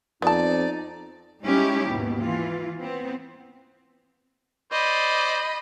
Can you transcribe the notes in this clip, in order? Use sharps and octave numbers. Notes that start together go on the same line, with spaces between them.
F2 B3 D#4 D5 A5
G3 G#3 C#4 D#4 E4 G4
D#2 G#2 B2
E3 F4
B3 C4
C5 D5 D#5 B5